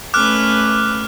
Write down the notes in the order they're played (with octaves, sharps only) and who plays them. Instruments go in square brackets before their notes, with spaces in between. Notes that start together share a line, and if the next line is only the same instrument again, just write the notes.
[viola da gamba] A3 C#4 B4 [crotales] D6 F6 F#6